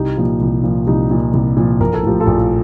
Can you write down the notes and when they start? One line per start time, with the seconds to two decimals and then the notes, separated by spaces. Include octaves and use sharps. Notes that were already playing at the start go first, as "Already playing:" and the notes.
Already playing: C2 D#4 G4
0.17 A#2 F3
0.41 C2
0.63 A#2 F3
0.86 C2 D#4 G4
1.10 A#2 F3
1.33 C2
1.57 A#2 F3
1.80 A#1 A#4
1.93 A4
2.03 A2 F3 G4
2.20 F4 A4
2.27 A#1